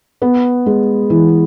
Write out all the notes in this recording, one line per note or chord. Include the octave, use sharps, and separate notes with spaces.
B3
G#3
E3